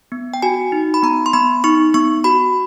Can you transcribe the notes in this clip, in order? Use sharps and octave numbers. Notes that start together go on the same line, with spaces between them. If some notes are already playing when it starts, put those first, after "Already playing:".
B3
G5
F#4 G#5
D#4
B5
B3 A#5
C6
B3 B5
D#4 C#6
B3 C#6
F#4 B5